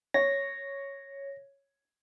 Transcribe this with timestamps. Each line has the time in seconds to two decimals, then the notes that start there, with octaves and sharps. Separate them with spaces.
0.14 C#5 A#6